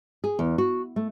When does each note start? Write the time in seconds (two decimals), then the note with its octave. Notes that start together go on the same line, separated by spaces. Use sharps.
0.24 G#4
0.39 E2
0.58 F#4
0.96 A3